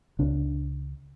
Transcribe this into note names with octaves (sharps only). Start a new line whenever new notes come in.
C#2 C#3 D4